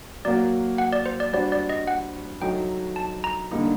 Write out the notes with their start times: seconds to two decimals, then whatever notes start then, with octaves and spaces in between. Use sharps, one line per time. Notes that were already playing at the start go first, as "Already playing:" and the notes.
0.25 F#3 A#3 F#4 D5
0.78 F#5
0.93 D5
1.06 C5
1.20 D5
1.33 G3 D4 F#4 C5 D5
1.52 D5
1.69 D#5
1.87 F#5
2.42 F#3 A3 D#4 G5
2.96 A5
3.24 A#5
3.51 D3 G3 A#3 D#4